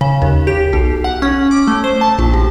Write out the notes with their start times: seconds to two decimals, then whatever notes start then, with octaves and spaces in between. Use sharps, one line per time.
0.01 C#3
0.22 D#2
0.47 G4
0.73 B1
1.04 F#5
1.22 C#4
1.51 D6
1.67 A3
1.84 C5
2.01 A5
2.19 A#1
2.34 A1